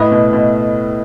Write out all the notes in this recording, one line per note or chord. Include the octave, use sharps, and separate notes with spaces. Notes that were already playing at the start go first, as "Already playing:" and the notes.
Already playing: A2 A3 E4 B4 D#5
B2
B2